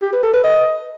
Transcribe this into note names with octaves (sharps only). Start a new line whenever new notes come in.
G4
B4
A4
B4
D#5